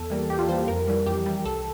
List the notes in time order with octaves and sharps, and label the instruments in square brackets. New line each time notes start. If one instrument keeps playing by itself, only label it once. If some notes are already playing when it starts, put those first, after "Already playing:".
Already playing: [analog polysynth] E2 A4
E3 G3 A#3
E2 G4
F4
E3 G3 A#3 C5
F2 A#4
E3 G3
F2 G4
E3 G3
C2 A4